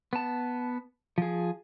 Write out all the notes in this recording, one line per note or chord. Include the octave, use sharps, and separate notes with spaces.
B3 A5
F3 G#4